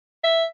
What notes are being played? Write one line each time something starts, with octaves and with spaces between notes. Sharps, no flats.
E5